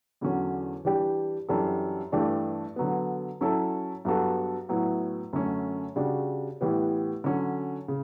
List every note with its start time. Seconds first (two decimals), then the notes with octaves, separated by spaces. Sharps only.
0.21 E2 D3 F#3 C#4 F#4
0.85 E3 G3 D4 G4
1.49 F#2 E3 G3 D4 A4
2.12 G2 E3 A3 D4 G4
2.76 D3 F#3 B3
3.41 F#3 C#4 E4 A4
4.05 G2 F#3 B3 F#4 A4
4.69 A2 F#3 B3 E4
5.33 F#2 D3 A3 C#4
5.96 C#3 G3 D4 F#4
6.61 A2 E3 G3 B3
7.24 D3 F#3 C#4
7.88 C#3